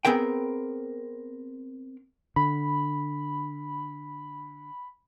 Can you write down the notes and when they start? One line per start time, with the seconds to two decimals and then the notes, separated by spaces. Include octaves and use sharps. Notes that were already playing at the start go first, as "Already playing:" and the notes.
0.05 B3 C4 G#4 A#4 G5
2.36 D3 B5